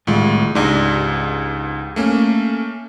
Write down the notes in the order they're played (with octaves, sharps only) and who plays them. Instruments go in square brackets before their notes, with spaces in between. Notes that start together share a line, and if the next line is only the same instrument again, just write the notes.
[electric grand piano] C2 F4 [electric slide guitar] A2 D#3 G#3
[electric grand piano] C#2 G#2 [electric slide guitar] D4 D#4 G4
[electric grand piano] A3 A#3 C#4